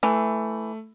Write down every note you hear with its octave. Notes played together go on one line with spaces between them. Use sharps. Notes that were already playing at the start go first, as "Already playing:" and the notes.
E3 A3